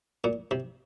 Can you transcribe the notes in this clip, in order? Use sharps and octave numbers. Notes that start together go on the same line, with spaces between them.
A#2
C3